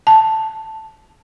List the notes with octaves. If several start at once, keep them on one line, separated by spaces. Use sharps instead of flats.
A5